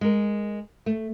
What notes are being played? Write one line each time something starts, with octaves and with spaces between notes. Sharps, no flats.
G#3 A#4
A3